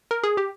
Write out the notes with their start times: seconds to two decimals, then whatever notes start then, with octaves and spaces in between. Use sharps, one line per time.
0.11 A#4
0.23 G#4
0.37 G4